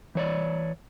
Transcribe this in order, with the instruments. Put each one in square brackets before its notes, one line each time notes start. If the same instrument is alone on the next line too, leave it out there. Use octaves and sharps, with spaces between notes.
[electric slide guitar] E3 C#5 D5